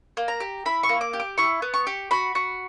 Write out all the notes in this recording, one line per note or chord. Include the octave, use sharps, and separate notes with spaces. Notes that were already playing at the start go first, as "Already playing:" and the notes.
A#3
A#5
G4
E4 B5
C#6
A#3
D6
G4
D6
E4 C#6
B3
C#6
G4
F#4 B5
F#4